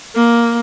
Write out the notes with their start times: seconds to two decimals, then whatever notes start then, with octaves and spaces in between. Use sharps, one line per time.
0.15 A#3